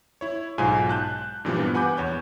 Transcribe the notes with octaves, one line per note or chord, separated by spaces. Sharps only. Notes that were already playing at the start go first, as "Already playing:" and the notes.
E4 C#5
B1 G#2 F4 G#5
A5 F#6 G6
G2 A#2 E3 F3 G3 B3
B4 F#5 G#5 B5 D6 G6
E2 C#5 G6